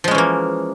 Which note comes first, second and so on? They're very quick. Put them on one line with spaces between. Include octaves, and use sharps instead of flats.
F3 G#3 C#4 E3 A#3